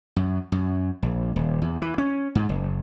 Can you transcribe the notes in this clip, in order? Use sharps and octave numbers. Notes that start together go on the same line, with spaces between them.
F#2
F#2
A#1
D#1
E2
E3
C#4
G#2
F#1